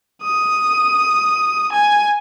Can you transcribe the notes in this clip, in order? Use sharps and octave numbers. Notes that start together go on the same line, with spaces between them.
D#6
G#5